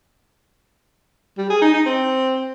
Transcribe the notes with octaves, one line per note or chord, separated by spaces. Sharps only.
G3
G#4
D#4
D#4
C4